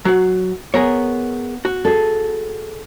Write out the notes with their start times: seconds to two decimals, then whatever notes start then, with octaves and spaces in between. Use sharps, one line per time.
0.05 F#3 F#5
0.74 B3 G#4 A#4 C#5
1.65 F#4
1.85 G#4 A4